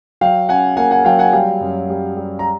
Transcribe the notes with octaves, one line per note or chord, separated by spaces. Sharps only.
F#3 F5 G5
C#4 F#5 G#5
A#3 F#5 G#5
F#5 G#5
F#3 F5 G5
F#5 G#5
G3 F5 G5
F#2
G3
G3
A#5